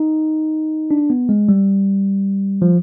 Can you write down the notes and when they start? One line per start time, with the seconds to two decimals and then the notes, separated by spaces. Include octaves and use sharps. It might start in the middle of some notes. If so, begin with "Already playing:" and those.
Already playing: D#4
0.91 D4
1.10 B3
1.29 G#3
1.49 G3
2.62 F3